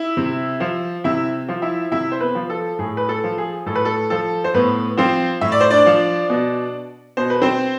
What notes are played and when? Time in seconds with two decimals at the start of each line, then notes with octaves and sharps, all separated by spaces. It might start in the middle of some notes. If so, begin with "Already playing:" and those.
Already playing: E4 E5
0.17 C3
0.60 F3
1.04 C3 E4 E5
1.49 F3
1.62 E4 E5
1.92 C3 E4 E5
2.12 C5
2.20 B3 B4
2.35 F3
2.50 A4
2.79 A2 G#4
2.97 B4
3.09 A4
3.24 F3
3.38 G#4
3.66 A2 A4
3.75 B4
3.85 A4
4.10 F3 A4
4.44 C5
4.54 A2 B3 B4
4.97 F3 C4 C5
5.41 A2 E5
5.52 D5
5.60 C5
5.70 D4 D5
5.86 F3
6.29 B2
7.17 B2 C5
7.30 B4
7.42 C4 C5